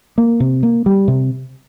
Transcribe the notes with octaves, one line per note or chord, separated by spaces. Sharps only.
A#3
C3
A#3
G3
C3